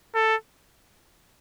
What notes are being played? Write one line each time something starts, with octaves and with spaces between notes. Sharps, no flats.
A4